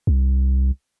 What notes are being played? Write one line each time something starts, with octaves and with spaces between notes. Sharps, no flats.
C2